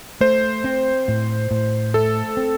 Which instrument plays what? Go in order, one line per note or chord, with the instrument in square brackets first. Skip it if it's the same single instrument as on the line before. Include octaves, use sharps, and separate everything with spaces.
[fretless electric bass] A3 [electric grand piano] C5
[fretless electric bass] C4
A2
A2
[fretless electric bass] A3 [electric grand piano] A4
[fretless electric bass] C4